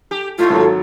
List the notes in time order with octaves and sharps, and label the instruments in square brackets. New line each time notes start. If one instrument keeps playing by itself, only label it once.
[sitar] G4
[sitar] G#2 A3 [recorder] F4
[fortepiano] G#1 F#3